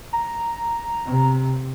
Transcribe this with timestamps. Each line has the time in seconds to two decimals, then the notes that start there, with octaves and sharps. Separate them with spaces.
0.13 A#5
1.06 C3